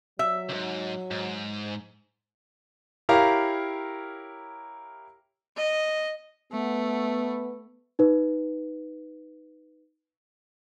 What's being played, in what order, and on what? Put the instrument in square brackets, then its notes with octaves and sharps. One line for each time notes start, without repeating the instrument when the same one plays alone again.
[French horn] F#3 [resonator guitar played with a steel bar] E5
[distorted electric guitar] C#2 G#2
G#2
[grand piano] E4 G4 A#4 C#5 F5 A#5
[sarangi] D#5
[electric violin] A3 [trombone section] B3
[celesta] D#4 B4